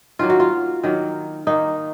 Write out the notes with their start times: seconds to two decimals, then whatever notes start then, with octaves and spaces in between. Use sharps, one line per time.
0.19 D#3 F#3 A#3 F4
0.30 F#4
0.40 F4
0.83 D#3 F#3 A#3
1.47 D#3 A#3 D#4